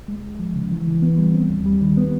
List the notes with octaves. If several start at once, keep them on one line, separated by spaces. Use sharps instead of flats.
G#3
C#2
F3
C#3
E3
E3
B3
G3
C4
D#2
G3
D#3
B3